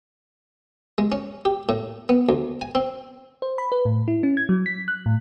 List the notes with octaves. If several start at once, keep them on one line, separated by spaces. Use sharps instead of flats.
G#3
C#4
G4
A2
B3
D2
G#5
C4
C5
B5
B4
A2
E4
C#4
G#6
F#3
B6
F#6
A2